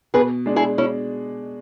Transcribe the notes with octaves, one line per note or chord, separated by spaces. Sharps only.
B2 G#4 B4
G#3 D4
E4 G#4
B2 C#4 E4